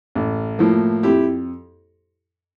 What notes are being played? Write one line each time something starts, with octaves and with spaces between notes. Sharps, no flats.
A1
A2 F3 A#3
F2 E4 G4